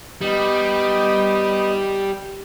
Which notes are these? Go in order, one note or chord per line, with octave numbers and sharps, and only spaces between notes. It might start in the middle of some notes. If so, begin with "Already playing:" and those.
G3 B3 D#4 D#6